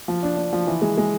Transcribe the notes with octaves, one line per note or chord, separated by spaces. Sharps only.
F3
D4
D4
F3
E3
G#3
G#3